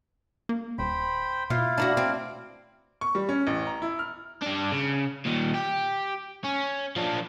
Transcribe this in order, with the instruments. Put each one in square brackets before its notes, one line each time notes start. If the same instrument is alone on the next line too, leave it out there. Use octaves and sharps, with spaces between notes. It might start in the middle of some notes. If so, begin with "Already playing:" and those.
[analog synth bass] A#3
[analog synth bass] D#1 [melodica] C5 G5 B5
[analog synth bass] B2 [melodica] E4 F5 [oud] F4
[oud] D4 D#4 F#4
C4
[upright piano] C#6
G3
C#4
A1
A#5
E4
F6
[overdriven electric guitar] G3 D4
C#3
A#2 D#3
G4
C#4
F3 D4